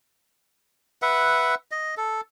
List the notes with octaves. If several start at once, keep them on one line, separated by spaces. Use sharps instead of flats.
B4 E5 F#5
D#5
A4